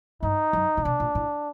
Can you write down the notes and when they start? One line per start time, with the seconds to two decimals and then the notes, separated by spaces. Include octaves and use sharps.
0.23 G2 D#4
0.53 F#2
0.77 A#2
0.85 B2 D4
1.00 A#2
1.15 A2